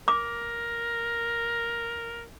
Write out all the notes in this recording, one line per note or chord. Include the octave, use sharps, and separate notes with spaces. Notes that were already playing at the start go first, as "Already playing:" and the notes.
A#4 D6